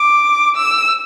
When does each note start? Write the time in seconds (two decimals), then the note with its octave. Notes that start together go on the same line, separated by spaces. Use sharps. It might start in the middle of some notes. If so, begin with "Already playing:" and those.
Already playing: D6
0.56 E6